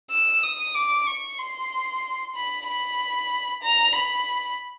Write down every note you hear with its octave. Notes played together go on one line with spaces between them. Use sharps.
E6
D#6
D6
C#6
C6
B5
B5
A#5
B5